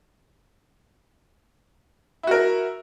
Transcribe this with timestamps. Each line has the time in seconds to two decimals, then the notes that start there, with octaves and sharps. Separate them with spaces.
2.23 E4
2.27 F#4
2.31 A#4